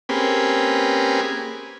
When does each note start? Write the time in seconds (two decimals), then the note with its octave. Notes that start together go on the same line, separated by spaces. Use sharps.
0.09 A#3 C4 C#4 G4 G#4 B4